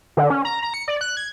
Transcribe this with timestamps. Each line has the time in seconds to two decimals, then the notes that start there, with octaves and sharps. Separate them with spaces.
0.17 D3
0.30 C#4
0.45 A#5
0.62 A#5
0.74 C#7
0.88 D5
1.01 F#6
1.17 G#6